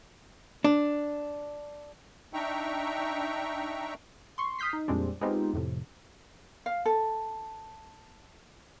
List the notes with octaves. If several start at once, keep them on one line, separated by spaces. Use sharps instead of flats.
D4
D4 D#4 E5 G5 A#5 C#6
C6 C#6
D#6 F6 G6 B6 C7
D#4
F2 A#2 G3 G#3 C4 D4
G#3 B3 C4 D#4 F4 G4
F2 A2 C3
F5
A4